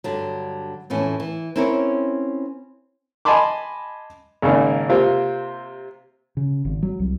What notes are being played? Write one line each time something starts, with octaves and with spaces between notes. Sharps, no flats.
G2 D3 F#3
F2 A2 E3 C#4
E3
C4 C#4 E4 A#4 C#5
D#5 G#5 A5 B5 C6 D6
G#1 C#3 A#3 D#4
C3 A#3 C4 F4
C#3
G#1
F#3
C2